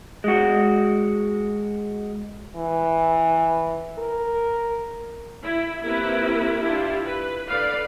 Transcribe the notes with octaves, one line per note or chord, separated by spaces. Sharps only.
G#3 F#4
E3
A#4
E4
A#3 C4 E4 G4 A#4 B4
D4 E4 F4 G4
B4
D3 B4 D5 F5